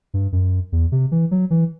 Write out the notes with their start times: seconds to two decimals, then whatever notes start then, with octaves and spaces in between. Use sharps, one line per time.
0.14 G2
0.32 F#2
0.72 E2
0.92 C3
1.12 E3
1.31 F#3
1.50 E3